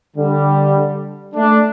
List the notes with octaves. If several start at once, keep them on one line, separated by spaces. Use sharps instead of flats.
D3 G3
A3 D4